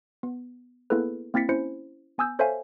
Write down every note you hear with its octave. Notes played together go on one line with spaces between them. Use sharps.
B3
A#3 B3 E4 G#4 A4 B4
A#3 C4 E4 A6 B6 C#7
C#4 E4 C5 C#7
B3 G#5 D#6 E6 G6
A4 C5 C#5 E5 F5 G#5